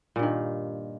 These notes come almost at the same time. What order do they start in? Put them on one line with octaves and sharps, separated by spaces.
A#2 G2 D#3